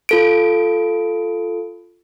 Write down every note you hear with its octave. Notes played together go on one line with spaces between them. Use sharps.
F4 A4 D7